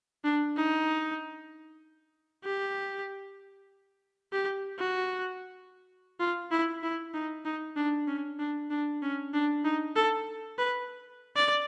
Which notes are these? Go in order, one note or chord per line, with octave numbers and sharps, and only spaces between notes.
D4
D#4
G4
G4
F#4
F4
E4
E4
D#4
D#4
D4
C#4
D4
D4
C#4
D4
D#4
A4
B4
D5